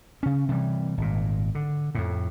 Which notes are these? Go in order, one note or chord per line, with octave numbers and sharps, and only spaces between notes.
C#3 C#4
C3 E3 G3
G#1 A#2
D3
F2 A2